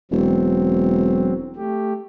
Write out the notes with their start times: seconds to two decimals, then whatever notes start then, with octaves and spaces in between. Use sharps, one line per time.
0.11 E1 F#3 C4
1.56 A3 G4